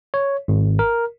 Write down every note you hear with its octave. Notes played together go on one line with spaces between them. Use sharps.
C#5
G#1
A#4